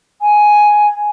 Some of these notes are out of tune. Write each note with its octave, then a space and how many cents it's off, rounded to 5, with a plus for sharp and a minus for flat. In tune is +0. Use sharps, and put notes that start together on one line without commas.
G#5 +5